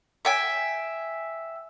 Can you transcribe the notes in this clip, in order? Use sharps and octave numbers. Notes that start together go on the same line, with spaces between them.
E5 G5 G#5